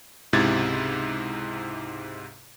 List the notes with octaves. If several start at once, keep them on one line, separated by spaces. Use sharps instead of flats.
C#2 G#2 C3 E4 G#6 A6